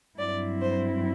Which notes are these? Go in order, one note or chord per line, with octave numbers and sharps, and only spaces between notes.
G2 F#3 C4 E4 D5
C5